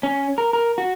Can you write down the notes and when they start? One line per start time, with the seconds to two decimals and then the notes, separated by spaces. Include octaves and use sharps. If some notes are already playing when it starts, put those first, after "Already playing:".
0.03 C#4
0.38 A#4
0.53 A#4
0.78 F#4